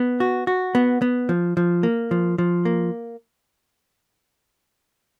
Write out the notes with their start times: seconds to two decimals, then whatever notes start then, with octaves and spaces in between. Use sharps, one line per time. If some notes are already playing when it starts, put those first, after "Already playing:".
Already playing: B3
0.20 F#4
0.47 F#4
0.75 B3
1.02 B3
1.29 F3
1.57 F3
1.83 A#3
2.11 F3
2.38 F3
2.65 A#3